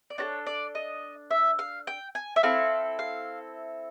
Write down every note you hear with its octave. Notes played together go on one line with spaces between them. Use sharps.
D5
D4 F#4 A4 C#5
D5
D#5
E5
F5
G5
G#5
E5
C4 E4 A4 F5
F5